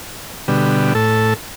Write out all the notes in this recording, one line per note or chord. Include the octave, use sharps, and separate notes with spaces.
B2 D3 G3
A2 A4